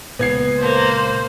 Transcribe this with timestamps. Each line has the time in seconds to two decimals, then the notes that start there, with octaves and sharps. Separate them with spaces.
0.19 C#2 A#2 B3 G#6 C7
0.62 A#3 C5